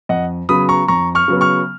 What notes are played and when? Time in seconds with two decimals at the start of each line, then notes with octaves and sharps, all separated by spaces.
0.09 F2 D#5 F#5
0.49 C#3 F#3 B3 B5 D#6
0.69 A#5 C#6
0.88 F2 A#5 C#6
1.15 C#6 F6
1.28 C#3 F#3 B3
1.41 C#6 F6